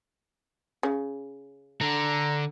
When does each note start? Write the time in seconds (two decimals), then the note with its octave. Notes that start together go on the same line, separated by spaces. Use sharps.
0.83 C#3
1.81 D3 A#5